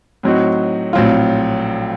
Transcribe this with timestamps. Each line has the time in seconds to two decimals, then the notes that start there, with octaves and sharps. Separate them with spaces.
0.23 A2 F#3 C4 D#4 F#4
0.93 A#1 A2 F#3 C4 F4